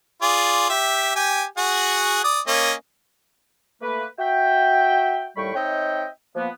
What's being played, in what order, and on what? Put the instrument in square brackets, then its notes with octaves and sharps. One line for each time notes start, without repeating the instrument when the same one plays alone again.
[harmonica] F4 G#4 D5
G4 E5
G4 G5 G#5
F#4 G#4 F#5
D5 D#6
A#3 C#4 D#5
[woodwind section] A3 A#3 B4
F#4 E5 G5
D#2 A2 G3 G5 B5 C#6
C4 D#4 C#5 D#5 E5 G5
F3 A#3 B3